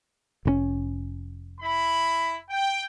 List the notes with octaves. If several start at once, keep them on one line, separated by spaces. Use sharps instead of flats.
F1 C3 C#4
E4 B5
G5